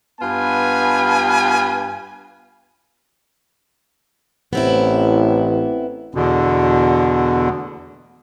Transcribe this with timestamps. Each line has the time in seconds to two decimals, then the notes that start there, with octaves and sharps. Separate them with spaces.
0.21 G2 B3 F4 B4 G#5
4.53 A1 B3 C4 E4
6.15 E2 B2 D3